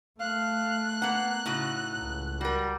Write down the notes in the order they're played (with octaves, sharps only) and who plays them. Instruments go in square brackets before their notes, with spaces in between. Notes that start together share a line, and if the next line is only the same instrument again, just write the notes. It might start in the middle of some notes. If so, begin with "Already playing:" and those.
[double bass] A3 [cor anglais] F5 [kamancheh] F#6
[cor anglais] A#3 [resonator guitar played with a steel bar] B3 F#5
[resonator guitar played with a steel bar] A2 C#3 F#4 [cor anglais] D#4
[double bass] C#2
[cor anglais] G3 [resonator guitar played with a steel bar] F#4 A#4